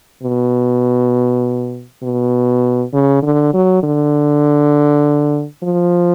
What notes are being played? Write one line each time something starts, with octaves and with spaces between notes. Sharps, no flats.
B2
B2
C#3
D3
F#3
D3
F3